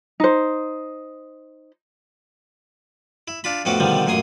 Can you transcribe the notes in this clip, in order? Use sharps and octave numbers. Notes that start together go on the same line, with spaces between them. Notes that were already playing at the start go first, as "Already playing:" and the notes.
D#4 C5
E4
D4 F4 B5
F2 A2 B3 C#4 F#4 D6
B2 D3 D#3 F3 G3
A1 F#2 A#2 G#5 C6 D#6